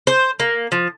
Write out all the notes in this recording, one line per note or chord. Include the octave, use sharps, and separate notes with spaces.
C5
A#3
F3